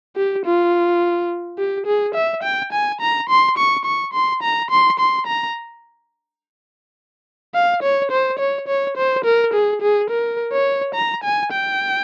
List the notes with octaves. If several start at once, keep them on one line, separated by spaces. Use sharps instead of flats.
G4
F4
G4
G#4
E5
G5
G#5
A#5
C6
C#6
C#6
C6
A#5
C6
C6
A#5
F5
C#5
C5
C#5
C#5
C5
A#4
G#4
G#4
A#4
C#5
A#5
G#5
G5